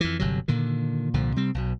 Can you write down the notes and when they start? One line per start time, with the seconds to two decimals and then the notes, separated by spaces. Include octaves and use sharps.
0.01 F2 E3
0.19 G1 C3 F#3
0.48 A#2 D3 D#3
1.14 C2 A#2 D3 F3
1.36 C3 G3 C4
1.55 B1 B2